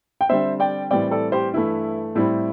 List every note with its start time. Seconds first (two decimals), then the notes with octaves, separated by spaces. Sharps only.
0.21 G5
0.29 D3 G3 C4 C5 E5
0.60 D5 G5
0.91 A2 E3 G3 C4 D5 G5
1.11 A4 D5
1.32 G4 C5
1.53 G2 E3 A3 E4
2.15 A2 G3 C4 E4